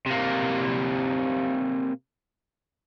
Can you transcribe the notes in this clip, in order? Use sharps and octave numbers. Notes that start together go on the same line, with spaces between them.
C3 A#3